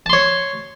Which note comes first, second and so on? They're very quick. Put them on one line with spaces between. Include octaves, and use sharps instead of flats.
A5 C6 C#5